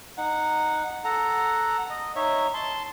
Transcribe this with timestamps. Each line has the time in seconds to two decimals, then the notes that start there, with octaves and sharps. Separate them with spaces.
0.17 D#4 F#5
1.04 A4 F#5 A#5
1.90 D#5
2.16 D#4 C#5 E5
2.54 A5 C6